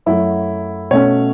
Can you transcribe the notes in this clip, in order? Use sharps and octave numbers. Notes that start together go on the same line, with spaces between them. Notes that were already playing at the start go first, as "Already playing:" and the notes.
F#2 F#3 A3 E4
B2 A3 C#4 C#5